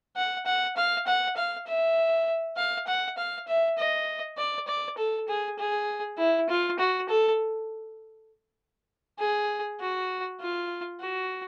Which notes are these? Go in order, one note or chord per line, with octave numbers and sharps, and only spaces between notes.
F#5
F#5
F5
F#5
F5
E5
F5
F#5
F5
E5
D#5
D5
D5
A4
G#4
G#4
E4
F4
F#4
A4
G#4
F#4
F4
F#4